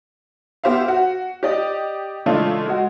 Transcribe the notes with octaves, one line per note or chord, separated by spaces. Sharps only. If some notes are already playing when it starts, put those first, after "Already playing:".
B3 G4 C5 E5 F5
F#4
G4 D5 D#5
C#3 E3 G#3 A3 D4 F4
G#3 F#4